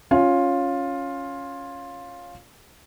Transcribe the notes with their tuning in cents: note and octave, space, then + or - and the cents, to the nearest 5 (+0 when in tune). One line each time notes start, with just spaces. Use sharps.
C#4 +0 F4 +10